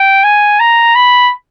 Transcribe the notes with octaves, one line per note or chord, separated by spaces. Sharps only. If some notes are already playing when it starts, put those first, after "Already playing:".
Already playing: G5
G#5
A#5
B5